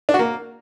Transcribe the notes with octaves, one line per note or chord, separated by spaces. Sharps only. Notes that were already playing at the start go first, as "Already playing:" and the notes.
D4
F#4
A#3